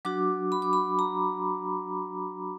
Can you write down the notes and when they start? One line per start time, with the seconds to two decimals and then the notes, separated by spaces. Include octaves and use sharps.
0.05 F#3 D4 F#4 D6
0.52 B5
0.62 D6
0.73 B5
0.99 A#5